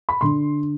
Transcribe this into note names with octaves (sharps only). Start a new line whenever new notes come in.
B5
D3 C6